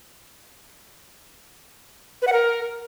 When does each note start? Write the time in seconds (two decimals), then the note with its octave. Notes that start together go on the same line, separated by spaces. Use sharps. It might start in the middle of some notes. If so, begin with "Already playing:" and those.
2.22 B4
2.27 F#5
2.33 A#4